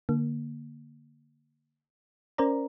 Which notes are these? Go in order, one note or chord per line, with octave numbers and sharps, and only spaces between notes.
D3 A#3
C#4 A#4 C5 D5 A#5